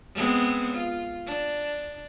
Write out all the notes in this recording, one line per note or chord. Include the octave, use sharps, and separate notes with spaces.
G#3 B3 C4
F4
D4